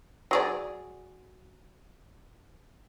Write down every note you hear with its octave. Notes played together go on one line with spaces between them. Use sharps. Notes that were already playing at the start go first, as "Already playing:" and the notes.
F#3 G#4 D5